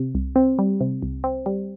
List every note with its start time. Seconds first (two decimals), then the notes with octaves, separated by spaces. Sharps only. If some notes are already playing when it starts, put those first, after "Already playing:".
Already playing: C3
0.15 C2
0.36 C4
0.59 G3
0.81 C3
1.02 C2
1.24 C4
1.46 G3